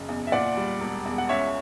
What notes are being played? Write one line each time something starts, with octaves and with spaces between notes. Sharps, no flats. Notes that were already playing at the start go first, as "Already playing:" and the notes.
Already playing: F#1 C#3
E2
E5
A#2 D5 F#5
G3
E1
E2
F#5
C#2 C#5 E5